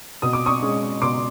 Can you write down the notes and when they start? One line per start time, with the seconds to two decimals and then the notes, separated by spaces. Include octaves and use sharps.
0.22 B2 D#6
0.33 D6
0.46 C#6 D#6
0.62 G#3 C#4
1.01 B2 C6 D6